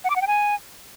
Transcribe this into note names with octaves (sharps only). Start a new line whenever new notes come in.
F#5
D6
F#5
G5
G#5